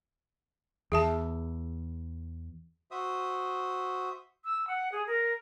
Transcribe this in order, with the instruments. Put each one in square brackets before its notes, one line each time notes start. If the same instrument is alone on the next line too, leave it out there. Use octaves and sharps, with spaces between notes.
[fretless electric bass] E2 [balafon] G#4 E5 A5
[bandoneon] F#4 C5 E5 D#6
[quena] E6
F#5
G#4
A#4